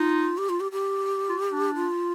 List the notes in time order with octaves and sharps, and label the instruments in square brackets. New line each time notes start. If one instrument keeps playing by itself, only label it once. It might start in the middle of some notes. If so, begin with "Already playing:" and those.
Already playing: [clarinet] D#4 [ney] F4
[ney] G4
F4
G4
G4
[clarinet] F4
D4
[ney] F4